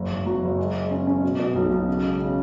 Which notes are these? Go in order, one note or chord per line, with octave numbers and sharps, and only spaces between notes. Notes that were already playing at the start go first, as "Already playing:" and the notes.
Already playing: F#1
F#1
F#3
F#1
G#3
G#3
C#4
C#4
B2
B2
B1
B1
C#3
G#3
C#3